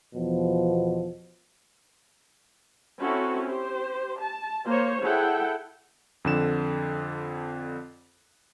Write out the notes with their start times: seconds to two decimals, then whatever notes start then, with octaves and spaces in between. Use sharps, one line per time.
0.15 E2 B2 F3
3.01 C4 C#4 E4 F#4 A4
3.46 G4 C5
4.18 A5
4.66 A#3 C5 C#5
5.02 E4 G#4 A4 F#5 G5
6.25 F2 D3 E7